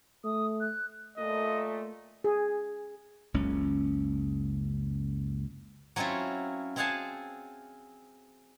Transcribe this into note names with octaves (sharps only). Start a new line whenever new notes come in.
A3 D#6
F#6
A#2 A3 D#5
G#4
F#1 C#2 C#4
F#3 C4 C#4 E4 F4
C4 G#4 F5 F#5 G#5 A5